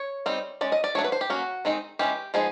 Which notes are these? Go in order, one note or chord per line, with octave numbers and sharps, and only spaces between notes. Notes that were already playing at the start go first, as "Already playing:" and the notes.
Already playing: C#5
G3 C4 D#4
G#3 C#4 D5
D#5
D5
F#3 A3 D4 C#5
B4
C5
G4
F#3 A#3 C#4 F#4
D#3 G#3 C4 D#4
E3 G#3 C#4 G4
F3 G#3 B3 D#4 G#4